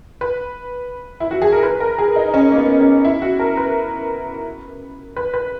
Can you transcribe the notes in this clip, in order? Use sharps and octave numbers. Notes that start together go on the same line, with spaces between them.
B4
E4
F#4
G#4
A#4
B4
A#4
G#4
D#4
C#4
A#3
B3
C#4
E4
F#4
A#4
B4
B4
B4